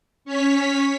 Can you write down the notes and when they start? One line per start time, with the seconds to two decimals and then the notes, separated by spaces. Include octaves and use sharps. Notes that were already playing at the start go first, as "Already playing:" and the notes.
0.25 C#4 C#5 B6